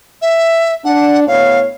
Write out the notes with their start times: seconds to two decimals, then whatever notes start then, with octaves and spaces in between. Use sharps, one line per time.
0.22 E5
0.85 D4 F#5
1.27 A2 B3 C#5 F5